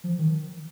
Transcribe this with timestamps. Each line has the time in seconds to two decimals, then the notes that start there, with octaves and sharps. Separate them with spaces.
0.04 F3
0.18 D#3